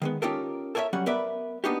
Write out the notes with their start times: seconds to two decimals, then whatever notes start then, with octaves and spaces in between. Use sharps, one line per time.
0.02 D#3 G#3 B3
0.22 C#4 D#4 F4 G4 A4 A#4
0.75 A4 A#4 C#5 D#5 E5
0.93 F#3 G3 C#4 F#5
1.06 B3 A#4 B4 D5 E5
1.64 A#3 B3 D4 D#4 F#4 G4